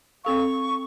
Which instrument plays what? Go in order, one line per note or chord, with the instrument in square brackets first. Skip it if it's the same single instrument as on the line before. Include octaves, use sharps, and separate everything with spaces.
[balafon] C4 A4 F5 [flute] C#6